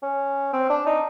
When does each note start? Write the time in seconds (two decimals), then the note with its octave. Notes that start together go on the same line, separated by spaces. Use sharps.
0.03 C#4
0.53 C4
0.70 D4
0.86 D#4